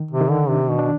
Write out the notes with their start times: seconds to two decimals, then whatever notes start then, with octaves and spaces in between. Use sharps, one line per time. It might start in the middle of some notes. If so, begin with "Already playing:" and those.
Already playing: D#3
0.11 C3
0.21 D#3
0.31 D3
0.49 C3 D4
0.69 B2
0.79 D4